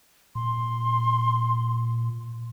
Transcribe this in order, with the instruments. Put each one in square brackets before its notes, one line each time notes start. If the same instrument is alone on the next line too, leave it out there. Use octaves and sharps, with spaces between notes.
[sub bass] A#2 [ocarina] C6